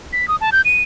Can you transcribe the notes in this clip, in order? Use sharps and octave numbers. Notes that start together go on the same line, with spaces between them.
B6
D#6
A5
G6
D#7